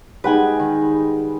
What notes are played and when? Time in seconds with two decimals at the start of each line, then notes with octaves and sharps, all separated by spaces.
0.24 G3 G#3 D#4 B4 F#5 G#5
0.59 D#3